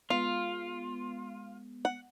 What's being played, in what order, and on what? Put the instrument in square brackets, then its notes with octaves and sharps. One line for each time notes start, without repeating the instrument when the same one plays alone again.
[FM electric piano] G#3 B3 [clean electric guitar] F4 [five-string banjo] F5
[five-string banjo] F#5